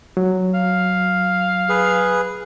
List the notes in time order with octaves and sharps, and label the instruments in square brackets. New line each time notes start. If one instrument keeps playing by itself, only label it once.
[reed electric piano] F#3
[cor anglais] F5
[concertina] G#4 B4